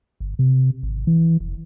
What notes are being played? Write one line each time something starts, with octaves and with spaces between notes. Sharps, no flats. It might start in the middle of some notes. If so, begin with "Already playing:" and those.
G1
C3
G#1
E3
F1